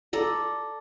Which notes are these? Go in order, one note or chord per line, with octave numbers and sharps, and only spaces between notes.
A4 D5 A#5